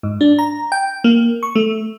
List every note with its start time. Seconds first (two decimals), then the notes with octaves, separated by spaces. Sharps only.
0.03 G#2
0.21 D4
0.39 A#5
0.72 G5
1.04 A#3
1.43 C#6
1.55 A3